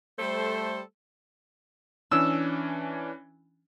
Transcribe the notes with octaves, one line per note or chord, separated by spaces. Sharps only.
G3 A3 A4 C5
E3 C#4 D4 E6